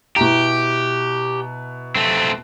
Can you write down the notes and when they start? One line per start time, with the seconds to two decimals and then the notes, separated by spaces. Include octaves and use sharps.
0.16 B2 E4 G4 A#5
1.96 A3 C4